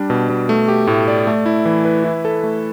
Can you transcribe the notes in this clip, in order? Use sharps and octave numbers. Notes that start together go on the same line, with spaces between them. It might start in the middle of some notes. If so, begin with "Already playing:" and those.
Already playing: G3 D4
B2
B2
A3
G4
A2
D5
A3
E4
E3
B4
E4
A4
A3